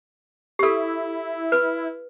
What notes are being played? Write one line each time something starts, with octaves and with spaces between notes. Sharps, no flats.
G4
E4 A4
B4